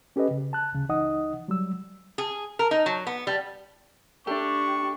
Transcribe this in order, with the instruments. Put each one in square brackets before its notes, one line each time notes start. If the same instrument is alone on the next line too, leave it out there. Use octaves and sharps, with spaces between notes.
[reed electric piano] C#4 G4 A4 B4 D#5
C#3
A5 F#6
D2 C#3
C#2 E3 D#4 D#5 F#5 D#6
F#3 G3 E6
[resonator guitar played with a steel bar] G#4
A#4
D#4
F#3
B3
G3
[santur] A3 [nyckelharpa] D4 [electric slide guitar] G4 [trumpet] C#6